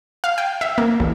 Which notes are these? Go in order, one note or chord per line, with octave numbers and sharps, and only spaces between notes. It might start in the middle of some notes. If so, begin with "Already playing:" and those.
F5
G5
E5
A#3
A1